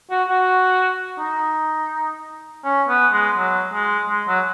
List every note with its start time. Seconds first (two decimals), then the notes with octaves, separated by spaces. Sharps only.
0.10 F#4
0.29 F#4
1.19 D#4
2.65 C#4
2.89 B3
3.13 G#3
3.37 F#3
3.74 G#3
4.10 G#3
4.28 F#3